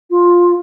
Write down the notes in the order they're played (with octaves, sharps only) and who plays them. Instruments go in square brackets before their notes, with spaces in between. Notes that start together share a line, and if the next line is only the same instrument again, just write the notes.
[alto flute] F4